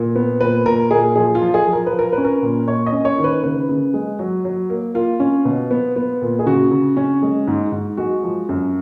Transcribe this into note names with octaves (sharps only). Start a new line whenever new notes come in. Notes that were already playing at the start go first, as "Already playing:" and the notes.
Already playing: A#2
B3
A#2 B4
A#2 A#4
A#2 G#4
F3 G#4
F4
F3
G#4
F3
A#4
B4
F3
A#4
B4
C#4
A#4
A#2
A#3 C#5
D#5
C#4
C#5
D#3
B4
C#3 B4
C#3
G#3
F#3
F#3
A#3
A#3 F4
C#4
B2
B3
B3
A#2
G#4
C#3 F#4
C#3
C#4
G#3
G#2
G#2
G#3 F#4
F3
F#2